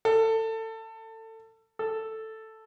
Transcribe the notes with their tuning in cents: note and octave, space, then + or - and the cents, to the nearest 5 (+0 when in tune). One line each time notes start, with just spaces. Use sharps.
A4 +25
A4 +5